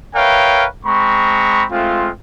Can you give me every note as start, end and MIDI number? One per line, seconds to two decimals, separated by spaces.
0.15 0.66 70
0.15 0.66 71
0.15 0.66 73
0.15 0.66 76
0.15 0.66 77
0.15 0.66 79
0.85 1.65 56
0.85 1.65 60
0.85 1.65 82
0.85 1.65 83
0.85 1.65 85
1.72 2.11 56
1.72 2.11 57
1.72 2.11 60
1.72 2.11 65